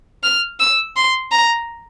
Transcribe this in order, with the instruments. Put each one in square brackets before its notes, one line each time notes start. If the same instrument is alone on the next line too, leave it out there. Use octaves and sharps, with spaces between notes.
[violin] F6
E6
C6
A#5